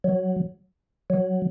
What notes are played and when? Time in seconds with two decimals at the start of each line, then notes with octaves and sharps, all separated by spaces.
0.04 F#3
1.10 F#3